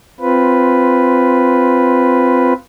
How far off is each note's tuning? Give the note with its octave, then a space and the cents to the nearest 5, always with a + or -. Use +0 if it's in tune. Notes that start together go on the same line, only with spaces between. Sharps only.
C4 -5 F4 +0 B4 +0